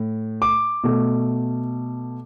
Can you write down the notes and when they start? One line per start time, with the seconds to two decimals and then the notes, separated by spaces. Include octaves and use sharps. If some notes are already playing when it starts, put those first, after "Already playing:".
Already playing: A2
0.42 D6
0.84 B2 A3